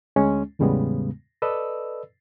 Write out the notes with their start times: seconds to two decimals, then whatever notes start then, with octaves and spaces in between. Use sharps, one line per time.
0.16 D2 G#3 C#4
0.59 E2 A2 C#3 G3 G#3 B3
1.42 A4 B4 D5 D#5 E6